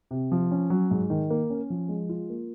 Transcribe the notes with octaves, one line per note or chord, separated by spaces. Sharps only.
C3
F3
C#4
F#3
G#2
D#3
A#3
C#4
F3
G#3
F4
A#3